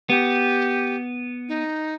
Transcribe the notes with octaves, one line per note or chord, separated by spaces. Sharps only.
B3 G4
D#4